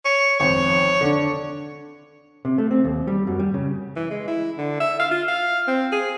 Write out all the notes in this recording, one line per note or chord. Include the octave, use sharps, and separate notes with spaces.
C#5
G#1 F2 C5 C#5
D3 D4
C3
A3
C4
D#2
G3
F#2
G3
C#3
E3
G#3
E4
D3
E5
F5
F4
F5
C4
G#4